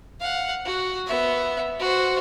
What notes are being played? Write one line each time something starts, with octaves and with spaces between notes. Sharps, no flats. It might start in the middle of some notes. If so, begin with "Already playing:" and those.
F5 F#5
F#4
B3 E5
F#4 C5